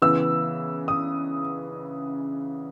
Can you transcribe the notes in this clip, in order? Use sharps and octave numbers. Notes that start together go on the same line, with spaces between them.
C#3 E3 B3 E6
D#6